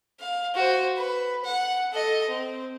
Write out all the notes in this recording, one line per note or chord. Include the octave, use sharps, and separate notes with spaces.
F5
F#4 C5
B4
F#5
A4 D#5
C4